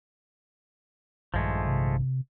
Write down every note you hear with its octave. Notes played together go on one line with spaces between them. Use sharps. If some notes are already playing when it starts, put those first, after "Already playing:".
A#1 G2 D#3 F3 G#3 A3
C3